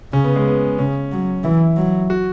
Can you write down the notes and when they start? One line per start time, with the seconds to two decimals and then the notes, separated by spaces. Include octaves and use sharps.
0.13 C#3 C#4
0.24 B3
0.36 G#3
0.48 B3
0.79 C#3 C#4
1.12 F#3
1.44 E3 E4
1.77 F#3
2.10 F#4